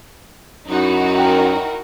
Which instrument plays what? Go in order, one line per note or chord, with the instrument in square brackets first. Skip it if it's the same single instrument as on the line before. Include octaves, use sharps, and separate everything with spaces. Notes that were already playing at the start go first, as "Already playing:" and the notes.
[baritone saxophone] F#2 [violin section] D#4 E4 F#4
[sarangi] A#4 [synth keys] G5